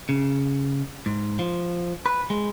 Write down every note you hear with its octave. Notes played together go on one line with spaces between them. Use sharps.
C#3
G#2
F3
B4
G#3